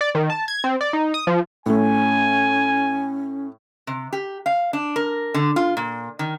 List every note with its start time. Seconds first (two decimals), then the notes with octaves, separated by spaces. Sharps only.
0.01 D5
0.15 D#3
0.30 A5
0.48 G#6
0.64 C4
0.81 D5
0.93 D#4
1.14 D#6
1.27 F3
1.66 A2 A3 C#4 G#5
3.87 C3
4.13 G4
4.46 F5
4.73 D4
4.96 A#4
5.34 D3
5.56 F4
5.77 A#2
6.19 D#3